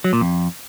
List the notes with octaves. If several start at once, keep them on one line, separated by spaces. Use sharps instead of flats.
F#3
A#2
F2